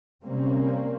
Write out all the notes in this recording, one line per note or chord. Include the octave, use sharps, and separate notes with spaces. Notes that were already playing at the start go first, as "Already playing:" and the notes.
C3 G3 A#3 C4 C#4